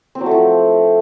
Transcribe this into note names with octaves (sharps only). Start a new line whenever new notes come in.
C4
F#3
A3
F3